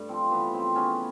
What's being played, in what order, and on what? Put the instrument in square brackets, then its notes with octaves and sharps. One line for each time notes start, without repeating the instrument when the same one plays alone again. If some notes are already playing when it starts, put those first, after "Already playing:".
Already playing: [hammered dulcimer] G2 A3
F3 C4
E3 B3
C#3 C4
C#3 B3 C#4